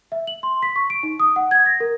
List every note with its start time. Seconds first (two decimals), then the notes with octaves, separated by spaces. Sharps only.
0.12 E5
0.27 F#7
0.43 C6
0.63 B6
0.76 C#6
0.90 D7
1.03 D#4
1.20 D#6
1.36 F#5
1.51 G#6
1.66 A#6
1.80 A#4